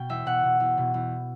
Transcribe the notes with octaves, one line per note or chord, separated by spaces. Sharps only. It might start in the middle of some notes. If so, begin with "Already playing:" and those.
Already playing: B2 G5
E2 E5
B2 F#5
B2
E2
B2
E2